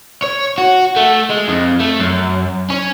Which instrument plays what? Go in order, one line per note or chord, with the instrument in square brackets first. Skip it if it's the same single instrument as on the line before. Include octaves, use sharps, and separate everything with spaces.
[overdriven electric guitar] C#5
F#4
A3
G#3
F2
A3
F#2
C#4